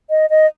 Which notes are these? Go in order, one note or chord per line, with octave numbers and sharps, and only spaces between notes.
D#5
D#5